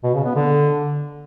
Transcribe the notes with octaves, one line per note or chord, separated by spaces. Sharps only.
B2
C#3
B3
D3